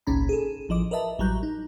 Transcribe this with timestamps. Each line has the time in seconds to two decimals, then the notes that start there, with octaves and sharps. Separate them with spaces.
0.07 G#1 C#2 A#2 C#4 A#5 B5
0.29 G#4 A4
0.69 A1 F3 D#5 D6
0.91 A#4 B4 D#5 E5 A5
1.19 A1 F#3 G3 A#5 F#6 G6
1.43 D#4